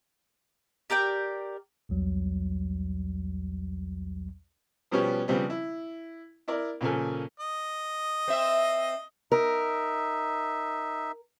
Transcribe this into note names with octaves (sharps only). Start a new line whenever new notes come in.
G4 A#4 D5 G5
B1 E2 F#3 G3
B2 F3 G3 B3 C#4 G4
C#3 F3 G3 B3 C4
E4
E4 A#4 D5
A#2 C#3 F3 A4 G#5
D#5
C4 E5
D#4 A#4 E5